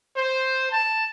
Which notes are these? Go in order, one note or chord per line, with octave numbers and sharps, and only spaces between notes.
C5
A5